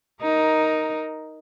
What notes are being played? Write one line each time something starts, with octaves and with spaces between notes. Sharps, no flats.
D#4 A#4